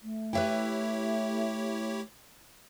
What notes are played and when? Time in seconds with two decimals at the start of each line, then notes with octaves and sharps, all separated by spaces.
0.02 A3
0.33 E4 G4 B4 C#5 E5 G5